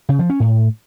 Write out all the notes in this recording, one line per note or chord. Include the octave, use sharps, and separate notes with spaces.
C#3
F3
C#4
A2